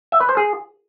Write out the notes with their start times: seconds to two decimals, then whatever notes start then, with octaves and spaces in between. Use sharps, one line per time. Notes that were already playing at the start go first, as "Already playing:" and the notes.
0.12 E5
0.20 B4
0.29 C5
0.37 G#4